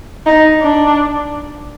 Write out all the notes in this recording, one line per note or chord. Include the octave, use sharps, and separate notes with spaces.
D#4
D4